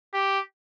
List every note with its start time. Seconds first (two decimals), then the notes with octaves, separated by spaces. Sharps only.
0.14 G4